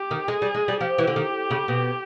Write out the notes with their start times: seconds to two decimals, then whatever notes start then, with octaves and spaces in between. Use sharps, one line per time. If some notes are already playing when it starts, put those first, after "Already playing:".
Already playing: G4
0.11 D#3
0.28 G#3 G#4
0.42 G3
0.54 G#3
0.68 G3
0.80 F3 G4
0.98 E3
1.07 D3
1.16 D#3
1.51 C#3
1.68 B2